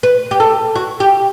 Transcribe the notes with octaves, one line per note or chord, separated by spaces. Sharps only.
B4
G4
A4
F#4
G4